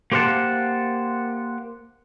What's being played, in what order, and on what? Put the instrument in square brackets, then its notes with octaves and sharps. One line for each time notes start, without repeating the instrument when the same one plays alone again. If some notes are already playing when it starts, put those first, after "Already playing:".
[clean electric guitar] A#3 G4 C5 F5 F#5 A5